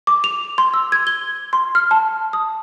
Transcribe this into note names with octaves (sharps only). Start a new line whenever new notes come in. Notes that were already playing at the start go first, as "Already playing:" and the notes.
D6
F7
C6
E6
G#6
G7
C6
F6
A5
D#6